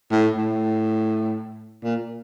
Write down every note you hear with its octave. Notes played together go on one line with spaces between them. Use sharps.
A2
A2
A#2